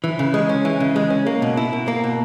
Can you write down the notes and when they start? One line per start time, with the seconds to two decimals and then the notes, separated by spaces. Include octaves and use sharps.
0.04 E3
0.19 C#3
0.34 G#3
0.49 C#4
0.65 E3
0.80 C#3
0.96 G#3
1.10 C#4
1.26 A#3
1.42 B2
1.57 E4
1.73 B2
1.88 A#3
2.04 B2